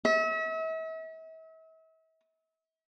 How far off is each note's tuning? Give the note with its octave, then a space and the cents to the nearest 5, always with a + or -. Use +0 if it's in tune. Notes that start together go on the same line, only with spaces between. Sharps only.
E5 -40